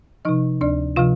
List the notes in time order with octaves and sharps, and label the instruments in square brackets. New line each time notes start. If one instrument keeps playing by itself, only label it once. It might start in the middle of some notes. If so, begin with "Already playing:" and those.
[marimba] C3 F3 D#4 D#5
D2 D4 D5
C3 F3 F4 F5